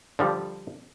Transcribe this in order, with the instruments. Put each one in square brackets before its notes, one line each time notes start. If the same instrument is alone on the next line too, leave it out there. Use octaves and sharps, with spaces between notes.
[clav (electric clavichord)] D3 F3 G3